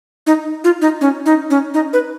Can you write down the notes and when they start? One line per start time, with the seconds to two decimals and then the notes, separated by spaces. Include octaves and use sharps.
0.27 D#4
0.64 F4
0.81 D#4
1.01 C#4
1.26 D#4
1.50 C#4
1.74 D#4
1.93 B4